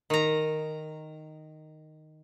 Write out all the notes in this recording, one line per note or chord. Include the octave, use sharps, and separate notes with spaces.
D#3 A#5